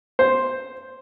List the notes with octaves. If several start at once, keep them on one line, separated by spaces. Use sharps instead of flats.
C5